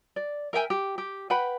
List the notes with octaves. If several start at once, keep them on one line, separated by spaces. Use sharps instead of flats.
D5
A#4 E5 G5 G#5
G4
G4
B4 F#5 G5 B5